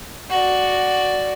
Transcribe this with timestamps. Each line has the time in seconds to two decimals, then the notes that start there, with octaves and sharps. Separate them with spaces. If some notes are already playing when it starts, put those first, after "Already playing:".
0.31 F#4 D5